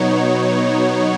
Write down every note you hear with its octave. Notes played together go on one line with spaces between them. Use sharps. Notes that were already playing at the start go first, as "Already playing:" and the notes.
Already playing: B2 F#3 B3 D#4 C#5